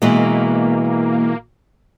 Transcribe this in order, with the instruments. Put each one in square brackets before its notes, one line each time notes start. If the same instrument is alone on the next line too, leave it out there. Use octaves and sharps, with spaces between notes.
[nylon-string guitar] B2 E3 G#3 [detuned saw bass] A#3